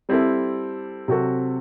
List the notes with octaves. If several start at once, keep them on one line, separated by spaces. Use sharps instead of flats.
G3 C4 E4 A4
C3 F#3 C4 F#4 A4